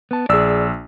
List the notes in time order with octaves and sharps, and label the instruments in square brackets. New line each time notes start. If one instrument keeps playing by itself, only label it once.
[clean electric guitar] B3 A5
[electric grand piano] A#1 E6 [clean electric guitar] G#4 D5